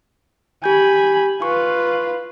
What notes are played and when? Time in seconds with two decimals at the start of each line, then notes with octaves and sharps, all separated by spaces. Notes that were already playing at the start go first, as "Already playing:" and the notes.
0.64 G4 G#5 B5 G6
1.42 F4 B4 C#6